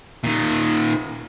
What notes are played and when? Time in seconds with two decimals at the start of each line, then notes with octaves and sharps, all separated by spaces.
0.24 A#2 D#3